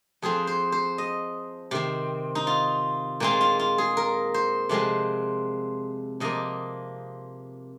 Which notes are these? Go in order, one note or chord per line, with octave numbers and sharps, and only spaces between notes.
F2 F3 C4 G#4
C5
C5
D#5
C3 D#3 C4
D#4
F4
A#2 G#3 C4 F4
F4
F4
G#4
A#4
C5
F2 C3 F3 G#3 C4
C3 F3 A#3 D#5